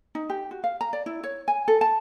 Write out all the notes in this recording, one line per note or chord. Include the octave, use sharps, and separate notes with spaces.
D#4
G4
F#4
F5
A#5
D5
E4
C#5
G#5
A4
A5